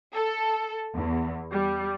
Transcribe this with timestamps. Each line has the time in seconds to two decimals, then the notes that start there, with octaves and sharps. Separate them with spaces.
0.14 A4
0.94 E2
1.52 G3